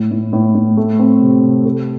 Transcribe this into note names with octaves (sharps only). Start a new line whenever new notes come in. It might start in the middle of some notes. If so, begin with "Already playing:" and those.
Already playing: A2
A2
A2
A2
A3
C4
C3
C3
A4